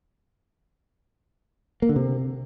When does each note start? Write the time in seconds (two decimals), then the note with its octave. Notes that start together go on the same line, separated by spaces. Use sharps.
1.82 A#3
1.89 D3
1.96 C3